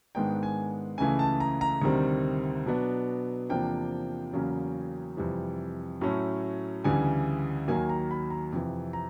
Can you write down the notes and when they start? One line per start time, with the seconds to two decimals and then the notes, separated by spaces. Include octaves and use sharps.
0.15 G#2 D#3 G#3 B3 D4 G5
0.43 G#5
0.98 C#2 C#3 E3 A3 G#5
1.19 A5
1.40 A#5
1.61 A#5
1.82 D2 C3 D#3 G3 C4
2.66 B2 F#3 B3 D4
3.50 E2 C3 F3 A#3 D4 G5
4.33 E2 C#3 F#3 A#3 C#4
5.17 F2 C3 E3 G3
6.01 A2 F#3 A3 C#4
6.84 D2 C#3 E3 G3 G#5
7.68 D#2 D#3 F#3 A#3 G#5
7.89 A#5
8.11 B5
8.30 A#5
8.52 F2 C3 E3
8.93 A#5